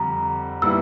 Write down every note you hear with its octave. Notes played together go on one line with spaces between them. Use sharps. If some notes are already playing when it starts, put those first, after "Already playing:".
Already playing: F2 D3 G3 A#5
A#2 G3 B3 E4 E6